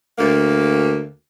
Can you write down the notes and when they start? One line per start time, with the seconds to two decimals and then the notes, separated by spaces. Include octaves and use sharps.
0.18 D2 A#3